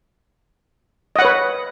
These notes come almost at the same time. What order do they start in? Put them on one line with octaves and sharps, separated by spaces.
D#5 F#5 C#5 B4